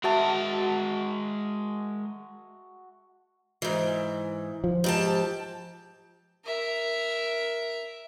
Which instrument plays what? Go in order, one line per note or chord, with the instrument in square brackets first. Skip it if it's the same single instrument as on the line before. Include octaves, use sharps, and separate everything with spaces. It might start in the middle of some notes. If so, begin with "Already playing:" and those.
[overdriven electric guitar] G#3 A#4 [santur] F#4 E5 A5
[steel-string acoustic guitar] G#2 E3
[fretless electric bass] F3
[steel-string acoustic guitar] G#2 G4 A5
[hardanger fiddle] A#4 E5